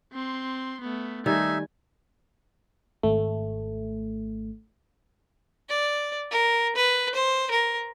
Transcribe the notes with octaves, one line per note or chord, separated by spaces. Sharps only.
C4 C6
A3 B3
D#3 G3 A3 D#4 E5 G#5
G#1 A3
D5
A#4
B4
C5
A#4